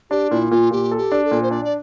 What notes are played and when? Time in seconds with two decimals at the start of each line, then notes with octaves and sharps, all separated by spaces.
0.10 D4 G4
0.30 A#2 E4
0.51 A#2 F4
0.71 A#2 G4
0.91 A4
0.98 G4
1.12 D4
1.25 A4
1.31 A#2
1.43 C5
1.51 D4 D5
1.65 D5